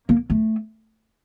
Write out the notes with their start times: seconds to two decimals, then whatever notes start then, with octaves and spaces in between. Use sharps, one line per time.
0.09 A#3
0.30 A3